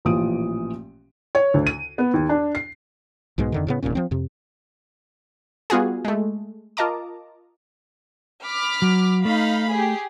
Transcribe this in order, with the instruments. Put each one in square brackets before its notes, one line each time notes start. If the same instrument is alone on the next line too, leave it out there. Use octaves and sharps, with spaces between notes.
[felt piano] A1 A#2 E3 F3 D#6 D7
C#5
D2
D#7
B3
D#2
D4
C7
[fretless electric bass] B1 G#2 B2 G#3
F2 D3 D#3
A2 C#3 B3
E1 D#2 A#2 C#4
F3 C4
F2 C3
[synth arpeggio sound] G3 B3 F4 F#4 G#4
G#3 A3
F4 A#4 D#5 A5 A#5 D6
[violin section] B5 D6 F6
[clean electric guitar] F#3
[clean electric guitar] A3 [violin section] D#4 F5 B5
[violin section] G4 G#4